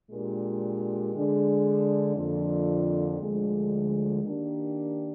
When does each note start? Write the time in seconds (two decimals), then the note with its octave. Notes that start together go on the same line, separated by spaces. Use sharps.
0.11 A#2 G#3 D4 G4 A#4
1.14 D3 G#3 D4 G#4
2.16 F2 D3 F3 A#3 D4
3.19 D2 D3 F3 G#3
4.22 D#3 A#3 D4 G4